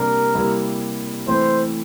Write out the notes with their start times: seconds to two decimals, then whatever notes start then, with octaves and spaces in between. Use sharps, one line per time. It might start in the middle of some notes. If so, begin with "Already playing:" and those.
Already playing: C3 G3 A#3 D4 A#4
0.34 C3 G3 A#3 E4
1.27 E3 A3 C4 E4 C5